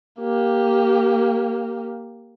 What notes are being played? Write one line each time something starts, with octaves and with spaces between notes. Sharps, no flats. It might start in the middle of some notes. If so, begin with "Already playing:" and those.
A#3 G4